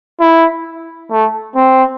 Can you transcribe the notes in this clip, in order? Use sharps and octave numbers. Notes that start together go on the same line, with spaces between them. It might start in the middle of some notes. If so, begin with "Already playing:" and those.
E4
A3
C4